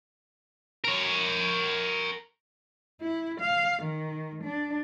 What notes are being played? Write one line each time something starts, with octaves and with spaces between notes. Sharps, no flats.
A#4 C#5
E4
F5
D#3
D4